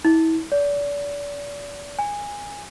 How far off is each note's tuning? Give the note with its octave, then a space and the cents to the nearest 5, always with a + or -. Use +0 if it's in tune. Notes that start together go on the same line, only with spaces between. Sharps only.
E4 -30
D5 -35
G#5 -15